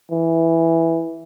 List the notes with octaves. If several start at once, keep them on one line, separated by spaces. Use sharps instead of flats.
E3